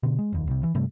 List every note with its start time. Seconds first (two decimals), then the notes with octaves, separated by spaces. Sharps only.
0.03 B2 D3
0.19 G#3
0.32 F1 D#2
0.47 C2 C3
0.63 E3
0.74 G2 C3 G3 A3